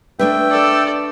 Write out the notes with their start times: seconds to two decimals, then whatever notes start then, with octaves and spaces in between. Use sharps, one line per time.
0.19 A3 D4 B4 E5 G5
0.51 A4 D5